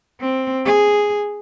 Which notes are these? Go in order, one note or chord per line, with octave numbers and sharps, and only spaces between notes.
C4
G#4